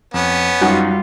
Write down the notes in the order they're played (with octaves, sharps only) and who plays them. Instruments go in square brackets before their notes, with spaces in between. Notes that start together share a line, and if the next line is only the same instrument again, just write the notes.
[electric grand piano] F2 [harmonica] B3 C#4
[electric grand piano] F#2 D#4 [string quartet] G3 F4 [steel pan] F#4